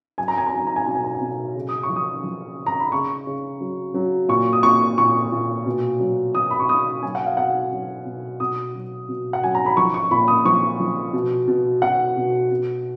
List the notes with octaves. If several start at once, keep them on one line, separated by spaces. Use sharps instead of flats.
F#3 G#5
A#5
G#5
A#5
F#3 G#5
A#5
G#5
B2 A#5
G#5
A#5
G#5
B2
C#3
D#6
C#6
F3
D#6
F3
C#3
A#5
B5
C#3 C#6
C#3
F#3
F#3
A#2 C#6
D#6
A#2 C#6
A#2 C#6
A#2
B2
F#3
B2 D#6
B5
C#6
B2 D#6
F#3 G#5
F#5
F5
B2 F#5
F#3
B2
B2 D#6
F#3
B2
F#5
F#3 G#5
A#5
B5
F3 C#6
C#6
A#2 B5
D#6
F3 C#6
F3
B2
B2
B2 F#5
B2
B2